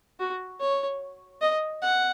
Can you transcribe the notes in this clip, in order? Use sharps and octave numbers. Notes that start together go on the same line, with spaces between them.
F#4
C#5
D#5
F#5